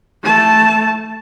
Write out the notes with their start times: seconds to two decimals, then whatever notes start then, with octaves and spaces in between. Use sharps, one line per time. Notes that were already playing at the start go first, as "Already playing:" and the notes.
0.23 A3 A5